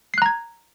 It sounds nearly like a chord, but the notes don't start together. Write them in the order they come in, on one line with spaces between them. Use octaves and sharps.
C7 F#6 A#5 G#6